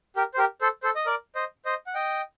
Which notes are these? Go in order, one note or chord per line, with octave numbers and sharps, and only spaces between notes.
G4 A#4
C5
G4 A#4
A4 C5
A4 C5
D#5
A#4 D5
C5 D#5
C5 D#5
F#5
D#5 G5